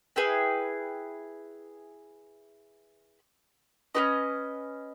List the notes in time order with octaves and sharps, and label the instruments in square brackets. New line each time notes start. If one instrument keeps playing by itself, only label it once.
[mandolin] E4 G#4 B4 G5
C#4 G4 B4 D#5